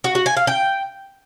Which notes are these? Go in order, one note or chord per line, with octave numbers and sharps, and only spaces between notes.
F#4
F#4
G#5
F5
G5